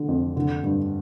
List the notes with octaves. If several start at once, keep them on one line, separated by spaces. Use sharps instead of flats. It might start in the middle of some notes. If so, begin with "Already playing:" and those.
Already playing: D3
F2
D3
G2